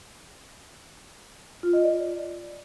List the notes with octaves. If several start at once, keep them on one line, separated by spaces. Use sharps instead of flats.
F4
D#5
D5